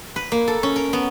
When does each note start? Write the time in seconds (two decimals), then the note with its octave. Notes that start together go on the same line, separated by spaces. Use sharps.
0.16 B4
0.32 A#3
0.48 A4
0.63 C#4
0.76 A#4
0.93 B3